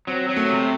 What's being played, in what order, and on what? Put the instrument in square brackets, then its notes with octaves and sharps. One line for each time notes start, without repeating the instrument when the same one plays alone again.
[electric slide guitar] F#3 [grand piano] C4
[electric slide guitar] F#3
[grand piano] A3
[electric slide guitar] C3